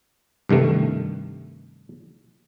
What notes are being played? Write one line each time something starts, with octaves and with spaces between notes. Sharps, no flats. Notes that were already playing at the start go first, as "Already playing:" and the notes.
C2 G2 D#3 A3